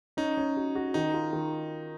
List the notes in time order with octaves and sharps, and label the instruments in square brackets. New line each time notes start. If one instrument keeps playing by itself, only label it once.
[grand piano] C#4 [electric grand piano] D#4
[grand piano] C#4
F#4
F#4
[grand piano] D#3 [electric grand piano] D#4
[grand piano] F4
D#3